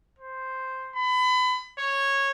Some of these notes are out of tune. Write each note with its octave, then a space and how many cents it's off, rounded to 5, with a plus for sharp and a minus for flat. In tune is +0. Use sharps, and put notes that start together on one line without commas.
C5 +0
B5 +30
C#5 -15